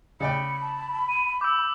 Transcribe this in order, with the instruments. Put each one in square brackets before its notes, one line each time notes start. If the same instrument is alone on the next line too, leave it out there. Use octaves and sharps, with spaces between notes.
[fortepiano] C#3 D5 G5 [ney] B5 [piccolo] C#7
[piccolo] A5
D#7
[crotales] D6 E6 [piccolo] G6